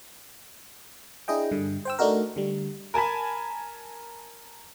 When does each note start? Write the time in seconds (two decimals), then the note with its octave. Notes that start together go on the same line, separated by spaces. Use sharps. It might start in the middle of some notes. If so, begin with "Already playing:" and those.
1.28 D4 E4 G#4 D#5 G5
1.52 G2 D3
1.85 C5 G5 E6
1.99 A3 D4 D#4 F#4 A#4
2.36 D3 G3
2.94 A#4 G#5 A5 B5